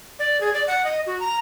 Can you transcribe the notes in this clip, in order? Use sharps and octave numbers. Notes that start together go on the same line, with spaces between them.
D5
G#4
D5
F#5
D#5
F#4
A#5